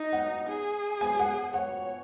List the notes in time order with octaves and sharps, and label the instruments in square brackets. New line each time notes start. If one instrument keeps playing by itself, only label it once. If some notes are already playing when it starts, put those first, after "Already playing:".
Already playing: [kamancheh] D#4
[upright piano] F#5
[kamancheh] G#4
[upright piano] G#5
F#5
[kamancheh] C#5 [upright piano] F#5